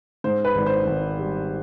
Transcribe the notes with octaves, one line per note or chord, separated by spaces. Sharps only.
G#2 C5
B4
G#1
C5
G#1
G3